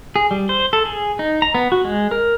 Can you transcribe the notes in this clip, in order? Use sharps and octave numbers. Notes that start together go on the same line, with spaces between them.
G#4
G3
C5
A4
G#4
D#4
A#5
B3
F#4
G#3
A#4